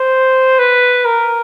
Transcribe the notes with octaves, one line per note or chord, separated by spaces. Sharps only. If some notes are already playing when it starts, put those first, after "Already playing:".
Already playing: C5
B4
A#4